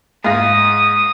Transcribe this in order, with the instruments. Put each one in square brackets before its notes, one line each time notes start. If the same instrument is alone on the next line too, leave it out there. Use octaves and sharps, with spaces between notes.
[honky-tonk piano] G#2 F5 A#6 [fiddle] D#6